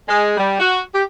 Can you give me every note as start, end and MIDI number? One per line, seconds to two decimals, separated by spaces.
0.08 0.34 56
0.37 0.59 55
0.59 0.81 66
0.93 1.03 67